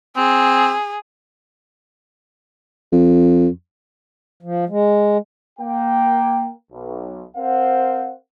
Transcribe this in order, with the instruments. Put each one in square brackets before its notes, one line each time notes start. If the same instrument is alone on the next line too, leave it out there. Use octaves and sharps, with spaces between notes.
[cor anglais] C4 [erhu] G#4
[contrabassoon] F2
[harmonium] F3
G#3
[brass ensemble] A#3 G5
B1
C4 A#4 C5 F5 F#5